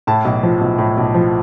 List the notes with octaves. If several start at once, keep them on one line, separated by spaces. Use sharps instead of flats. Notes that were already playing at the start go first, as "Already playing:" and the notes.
A2 A5
B1
F3
B1
A2
B1
F3